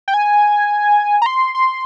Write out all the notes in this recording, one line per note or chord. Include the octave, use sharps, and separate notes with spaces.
G5
G#5
A#5
C6
C6